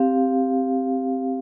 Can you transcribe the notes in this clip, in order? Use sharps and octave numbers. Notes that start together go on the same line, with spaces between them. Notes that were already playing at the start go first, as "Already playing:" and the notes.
Already playing: C4 G4 F5